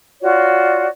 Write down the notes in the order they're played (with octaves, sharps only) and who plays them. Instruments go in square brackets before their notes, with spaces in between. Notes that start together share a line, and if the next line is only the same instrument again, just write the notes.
[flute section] F4 F#4 C#5 D5